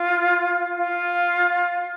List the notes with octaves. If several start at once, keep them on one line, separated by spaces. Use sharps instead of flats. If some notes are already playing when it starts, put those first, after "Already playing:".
Already playing: F4
F4